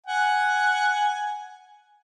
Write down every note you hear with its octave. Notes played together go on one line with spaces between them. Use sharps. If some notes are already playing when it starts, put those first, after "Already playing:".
F#5 G#5